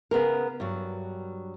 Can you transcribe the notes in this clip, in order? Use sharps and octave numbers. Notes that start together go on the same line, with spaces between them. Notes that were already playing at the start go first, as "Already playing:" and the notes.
C#3 B3 G#4 A#4
G2 F#3